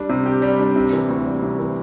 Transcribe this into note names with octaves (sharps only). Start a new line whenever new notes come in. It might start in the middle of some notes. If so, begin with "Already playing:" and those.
Already playing: G3 D4
C3
G4
G3
D4
C3
E3
D2
G3
C3
E3